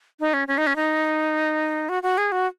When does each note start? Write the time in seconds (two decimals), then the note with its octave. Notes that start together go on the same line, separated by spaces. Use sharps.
0.20 D#4
0.34 C#4
0.48 C#4
0.58 D#4
0.67 C#4
0.76 D#4
1.89 F#4
2.03 F#4
2.18 G#4
2.32 F#4